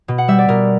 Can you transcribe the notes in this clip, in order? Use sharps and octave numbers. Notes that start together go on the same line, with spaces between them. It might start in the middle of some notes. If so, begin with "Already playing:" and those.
B2
F#5
G3 E5
D5
B2 A#4